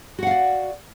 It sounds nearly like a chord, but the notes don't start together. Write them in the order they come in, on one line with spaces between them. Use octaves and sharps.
F#4 F#5 F5 D5